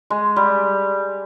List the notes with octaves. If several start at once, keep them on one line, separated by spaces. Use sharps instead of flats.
G#3
G3